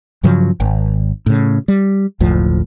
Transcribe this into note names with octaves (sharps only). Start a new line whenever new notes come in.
G2 C#3 F3 F#3
G#1
A2 C#3
G3
F#1 D2 A2 F3